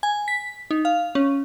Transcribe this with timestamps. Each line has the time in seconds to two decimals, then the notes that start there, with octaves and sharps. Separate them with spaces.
0.03 G#5
0.28 B6
0.71 D#4
0.85 F5
1.15 C#4